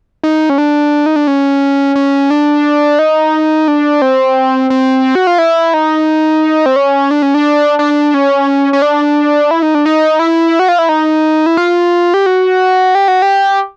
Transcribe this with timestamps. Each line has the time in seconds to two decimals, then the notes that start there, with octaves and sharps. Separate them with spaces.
0.24 D#4
0.50 C#4
0.58 D4
1.06 D#4
1.16 D4
1.27 C#4
1.96 C#4
2.30 D4
2.99 D#4
3.68 D4
4.02 C4
4.70 C4
5.15 F#4
5.27 F4
5.38 E4
5.74 D#4
6.66 C4
6.76 C#4
7.11 D4
7.22 C#4
7.34 D4
7.79 D4
8.14 C#4
8.73 C#4
8.82 D4
9.51 E4
9.62 D#4
9.75 D4
9.86 D#4
10.19 E4
10.59 F#4
10.69 F4
10.79 E4
10.89 D#4
11.46 E4
11.57 F4
12.14 G4
12.26 F#4
12.95 G4
13.08 F#4
13.22 G4